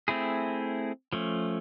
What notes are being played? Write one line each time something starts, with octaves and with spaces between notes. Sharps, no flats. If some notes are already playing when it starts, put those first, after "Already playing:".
A3 C4 E4 G#4
F3 A3 C#4